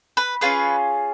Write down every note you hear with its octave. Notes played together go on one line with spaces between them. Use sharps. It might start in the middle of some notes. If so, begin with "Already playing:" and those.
B4
C#4 F4 G#4 B4